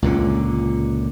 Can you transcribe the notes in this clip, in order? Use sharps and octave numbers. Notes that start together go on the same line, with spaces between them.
C#2 A#2 D3